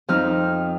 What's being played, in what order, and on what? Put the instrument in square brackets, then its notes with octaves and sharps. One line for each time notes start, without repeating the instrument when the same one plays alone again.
[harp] F2 F3 D#4 F6